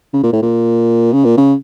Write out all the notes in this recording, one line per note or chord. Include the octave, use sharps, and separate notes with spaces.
C#3
A#2
A2
A#2
C#3
A#2
C#3